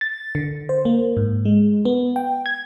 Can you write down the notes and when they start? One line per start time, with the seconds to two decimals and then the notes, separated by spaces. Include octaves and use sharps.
0.01 A6
0.35 D3
0.69 C5
0.85 A#3
1.17 G#2
1.45 G#3
1.85 B3
2.16 G5
2.46 G#6